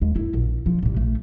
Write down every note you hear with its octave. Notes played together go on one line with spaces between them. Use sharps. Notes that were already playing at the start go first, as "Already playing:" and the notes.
D#2 G#3
F#2 E4
A#1
D3 F3
A1 C3
A#1 A3